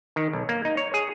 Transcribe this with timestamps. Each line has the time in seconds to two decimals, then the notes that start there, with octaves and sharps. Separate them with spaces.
0.16 D#3
0.33 B1
0.49 A#3
0.65 D#4
0.77 C#5
0.94 G#4